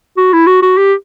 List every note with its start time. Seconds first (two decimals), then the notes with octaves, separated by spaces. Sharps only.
0.17 F#4
0.33 E4
0.47 F#4
0.62 F#4
0.78 G4